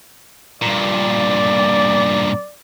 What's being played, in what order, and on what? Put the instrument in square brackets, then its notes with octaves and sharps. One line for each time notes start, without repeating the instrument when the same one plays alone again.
[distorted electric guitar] G2 A#2 [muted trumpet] D5